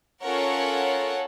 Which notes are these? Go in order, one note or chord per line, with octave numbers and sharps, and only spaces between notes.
C#4 F4 A4 A#4 C#5 F#5